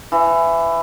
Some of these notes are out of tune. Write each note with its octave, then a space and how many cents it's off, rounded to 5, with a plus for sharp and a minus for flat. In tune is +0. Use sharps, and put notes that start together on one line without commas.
E3 +15